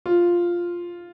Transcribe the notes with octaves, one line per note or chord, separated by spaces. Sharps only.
F4